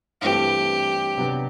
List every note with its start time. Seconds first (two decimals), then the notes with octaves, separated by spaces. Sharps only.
0.22 G2 E3 A3 C4 G4
1.17 C3 F#3 B3 D4